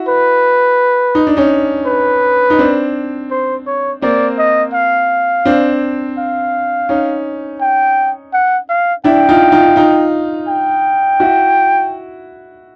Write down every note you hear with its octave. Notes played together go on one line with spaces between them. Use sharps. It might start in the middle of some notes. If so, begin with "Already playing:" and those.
Already playing: E4 F#4
B4
D#4
D4
C#4 D#4
B4
D#4
C4 D4
C5
C#5
A#3 C4 D5
D#5
F5
C4 D4
F5
C#4 D#4
G5
F#5
F5
D4 E4 G5
D#4 F4
D#4 F4
D#4 F4
G5
E4 F#4